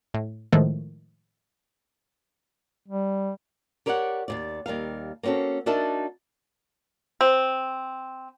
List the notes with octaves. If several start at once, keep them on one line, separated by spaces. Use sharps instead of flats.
A2
A2 D#3 F3 G#3 A3
G3
G4 A#4 C#5 D5 F5 F#5
D#2 A#2 D5
D#2 G3 A#4 F5
A#3 C4 C#4 F#4 A4
D4 D#4 F#4 A#4 E5 A5
C4